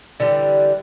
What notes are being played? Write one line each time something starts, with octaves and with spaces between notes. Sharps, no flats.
D3 E3 G3